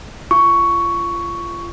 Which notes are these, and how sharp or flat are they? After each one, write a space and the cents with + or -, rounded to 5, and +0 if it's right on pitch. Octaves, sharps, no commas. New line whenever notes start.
F4 -30 C#6 +10